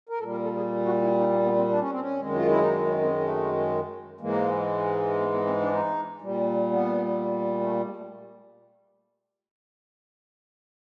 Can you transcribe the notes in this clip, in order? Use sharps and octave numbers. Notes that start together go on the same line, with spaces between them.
A#4
A#2 G3 A4
A#4
A4
G#4
F#4
E4
D#4
A#3
B3
C4
D4
C#4
C4
C#4
F#2 D#3 G#3
F4
E4
D#4
D4
C#4
C4
A3
G#2 E3 G#3 A#3
B3
B3
C4
D4
D#4
A#2 G3
B3
A3
A#3
G#3
A3